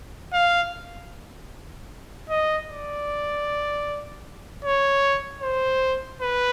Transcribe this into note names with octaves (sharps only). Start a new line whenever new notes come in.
F5
D#5
D5
C#5
C5
B4